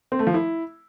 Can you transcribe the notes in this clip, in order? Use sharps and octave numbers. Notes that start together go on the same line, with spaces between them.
C4
A3
F3
E4